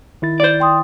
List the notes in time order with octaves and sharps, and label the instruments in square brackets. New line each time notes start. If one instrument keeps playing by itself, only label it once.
[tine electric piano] D#3 E4 A6
[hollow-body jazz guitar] C5 D5
[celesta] G5 C6 D#6